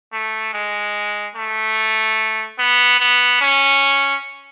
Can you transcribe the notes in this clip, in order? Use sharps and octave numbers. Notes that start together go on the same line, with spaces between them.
A3
G#3
A3
B3
B3
C#4